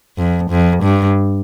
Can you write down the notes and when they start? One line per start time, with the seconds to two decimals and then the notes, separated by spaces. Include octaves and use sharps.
0.18 F2
0.51 F2
0.83 G2